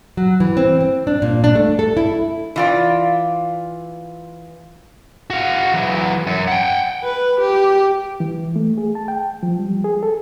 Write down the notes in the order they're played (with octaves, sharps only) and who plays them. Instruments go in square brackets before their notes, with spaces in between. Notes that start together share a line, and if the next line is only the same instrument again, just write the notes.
[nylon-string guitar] F#3
E3
C4
C4
D4
A#2
D4
A3
A4
E4
[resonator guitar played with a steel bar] E3 F4 D5
[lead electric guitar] F#4 F5
E3 F#3
F#2
F#5 G5
[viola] B4
G4
[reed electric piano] E3
A3
G#4
A5
G5
F3
G3
G#4
A4